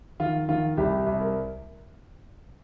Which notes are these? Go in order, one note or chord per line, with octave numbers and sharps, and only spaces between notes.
D#3 F4
D#3 F4
C2 G4
C2
A#4